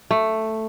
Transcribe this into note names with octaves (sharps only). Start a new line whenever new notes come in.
A3